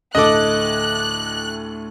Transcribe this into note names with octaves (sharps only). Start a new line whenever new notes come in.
D2 A2 A4 D#5 D6 F#6